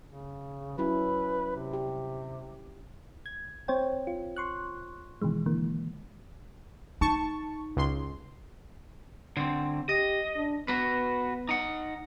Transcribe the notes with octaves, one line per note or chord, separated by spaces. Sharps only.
C#3
F#3 C#4 E4 B4
C3
G4
G#6
C4 C5 C#5 G5
F4
C6 C#6 F#6
B2 D#3 E3 G#3
D3 E3 A#3
D#4 A5 C#6
C#2 C6
D3 C4
G4 D#5
D4
B3 F#4 B4
D#4 F#5